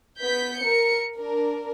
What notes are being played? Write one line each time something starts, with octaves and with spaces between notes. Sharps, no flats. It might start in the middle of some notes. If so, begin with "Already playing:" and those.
B3 G6 B6
A#4 C#7
D4 A#4